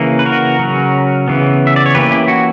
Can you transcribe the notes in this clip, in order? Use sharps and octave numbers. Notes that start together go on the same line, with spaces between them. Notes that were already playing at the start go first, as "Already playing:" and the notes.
Already playing: C#3 E3 A#3
B4
F#4 A#4
C#3 F#3 C#4
C#3 E3 B3
E5
D5
C#5
E3 A#3 C#4 G4 B4
E4 G4
F#4